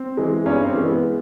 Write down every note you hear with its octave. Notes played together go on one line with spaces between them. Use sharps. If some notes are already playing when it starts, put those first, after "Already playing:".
Already playing: C4
E3 G#3
G2 C#4
C4
E3 G#3
B3